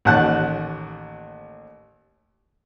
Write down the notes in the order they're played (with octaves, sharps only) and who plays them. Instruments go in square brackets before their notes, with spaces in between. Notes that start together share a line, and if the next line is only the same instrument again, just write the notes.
[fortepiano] A1 D#2 F#5 A5 F#6